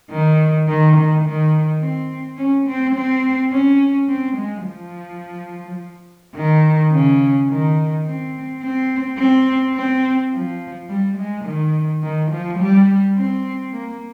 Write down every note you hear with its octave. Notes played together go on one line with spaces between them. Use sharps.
D#3
D#3
D#3
D#3
C4
C#4
C4
C4
C#4
C4
G#3
F3
D#3
C#3
D#3
C4
C4
C4
C4
F3
G3
G#3
D#3
D#3
F3
G3
C4
A#3